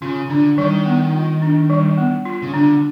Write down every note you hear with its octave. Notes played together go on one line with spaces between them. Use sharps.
C#3 F4
D3 D4
D#3 G3
B3
F4
D4
G3
B3
F4
C#3
D3 D4